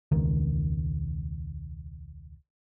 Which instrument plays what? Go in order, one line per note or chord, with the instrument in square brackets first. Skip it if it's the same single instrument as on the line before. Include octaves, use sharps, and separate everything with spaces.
[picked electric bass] E1 C#2 D#3